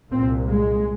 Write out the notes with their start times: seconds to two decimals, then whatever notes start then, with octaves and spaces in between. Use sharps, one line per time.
0.11 C2 A#2 C4
0.48 G#3